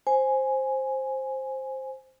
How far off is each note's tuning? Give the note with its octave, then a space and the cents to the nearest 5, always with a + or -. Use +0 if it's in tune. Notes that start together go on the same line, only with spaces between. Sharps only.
C5 +10 G#5 +0